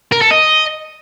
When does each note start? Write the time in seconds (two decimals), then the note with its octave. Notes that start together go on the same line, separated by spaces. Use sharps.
0.12 A#4
0.22 A4
0.31 D#5